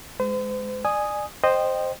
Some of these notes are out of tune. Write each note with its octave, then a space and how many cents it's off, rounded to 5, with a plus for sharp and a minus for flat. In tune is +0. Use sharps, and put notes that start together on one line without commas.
G#3 +0 C5 -45
D5 +30 G#5 +0 D#6 +0
C5 +0 D#5 -15 G5 +0